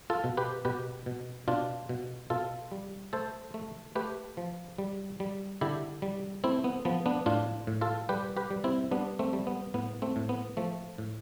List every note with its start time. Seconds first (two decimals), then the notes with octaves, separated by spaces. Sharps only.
0.10 F4 A4
0.24 B2
0.37 G4 B4
0.65 B2 G4 B4
1.06 B2
1.48 B2 D4 F4
1.89 B2
2.30 B2 F4 A4
2.72 G3
3.13 A3 A4 C5
3.54 A3
3.95 A3 G4 B4
4.37 F3
4.78 G3
5.20 G3
5.61 D3 E4 G4
6.02 G3
6.44 A3 C4 E4
6.64 B3
6.85 F3 B3
7.06 B3 D4
7.26 A2 D4 F4
7.67 A2
7.81 F4 A4
8.09 G3 G4 B4
8.37 G4 B4
8.50 G3
8.64 C4 E4
8.91 G3 B3 D4
9.19 A3 C4
9.33 G3
9.47 B3
9.74 A2 B3
10.02 A3 C4
10.16 A2
10.29 B3
10.57 F3 A3
10.98 A2